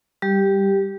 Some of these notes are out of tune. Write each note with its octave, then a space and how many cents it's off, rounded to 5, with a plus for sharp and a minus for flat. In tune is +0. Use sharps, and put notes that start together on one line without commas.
G3 +0 G4 +0